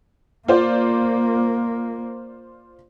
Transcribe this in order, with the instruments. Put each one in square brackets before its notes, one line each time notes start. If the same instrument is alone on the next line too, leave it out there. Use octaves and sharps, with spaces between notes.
[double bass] A#3 [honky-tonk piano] F4 C5 D5